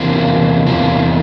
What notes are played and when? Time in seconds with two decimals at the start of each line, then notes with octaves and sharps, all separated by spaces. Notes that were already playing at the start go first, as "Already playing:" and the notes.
Already playing: E2 C3 E3 A#3 F4
0.67 E2 C3 E3 A#3 F4